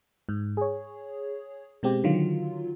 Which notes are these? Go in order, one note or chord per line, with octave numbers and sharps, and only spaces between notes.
G#2
G#4 C#5
B2 G#3 C4 G4
D3 D#3 F#3 F4